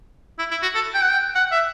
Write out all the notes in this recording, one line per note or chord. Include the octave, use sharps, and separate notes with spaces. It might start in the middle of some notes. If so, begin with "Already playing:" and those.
E4
E4
F#4
A4
G5
F#5
G5
F#5
E5